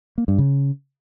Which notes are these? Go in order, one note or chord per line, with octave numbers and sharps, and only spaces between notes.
A#3
G2
C#3